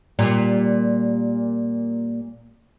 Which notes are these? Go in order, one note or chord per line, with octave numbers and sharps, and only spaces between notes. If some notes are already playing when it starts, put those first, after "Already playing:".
A#2 G3